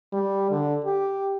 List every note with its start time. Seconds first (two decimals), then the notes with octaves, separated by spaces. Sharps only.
0.13 G3
0.51 D3
0.85 G4